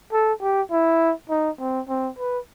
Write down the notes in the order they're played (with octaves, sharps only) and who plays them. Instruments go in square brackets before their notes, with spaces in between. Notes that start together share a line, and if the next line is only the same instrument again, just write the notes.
[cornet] A4
G4
E4
D#4
C4
C4
B4